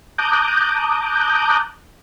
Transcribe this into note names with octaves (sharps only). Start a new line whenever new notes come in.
A5 A#5 D6 D#6 F#6 G6